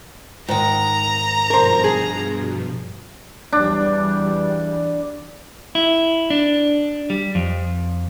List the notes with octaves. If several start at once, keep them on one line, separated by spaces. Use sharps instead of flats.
G#2 D#3 A#5
G2 B2 F3 A#4 C5
G#4
E2 E3 G3 D4
E4
D4
G3
F2